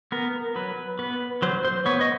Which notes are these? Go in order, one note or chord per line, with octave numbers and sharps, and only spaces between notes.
B3 A#4
F#3 B4
B3 B4
F#3 C5
C5
B3 C#5
D#5